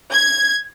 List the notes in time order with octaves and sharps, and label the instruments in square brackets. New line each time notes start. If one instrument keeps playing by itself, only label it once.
[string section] G#6